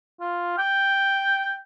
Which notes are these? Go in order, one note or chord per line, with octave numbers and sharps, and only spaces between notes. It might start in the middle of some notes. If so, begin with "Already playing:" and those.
F4
G5